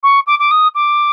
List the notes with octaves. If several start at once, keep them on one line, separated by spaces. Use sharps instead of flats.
C#6
D6
D6
D#6
D6